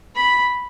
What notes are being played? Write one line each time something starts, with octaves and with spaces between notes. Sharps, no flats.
B5